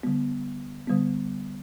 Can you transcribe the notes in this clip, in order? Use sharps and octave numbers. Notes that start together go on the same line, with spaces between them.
D3 G3 B3
D3 G3 B3